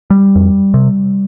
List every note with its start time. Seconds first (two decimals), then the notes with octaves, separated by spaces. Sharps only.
0.10 G3
0.35 F2
0.74 C3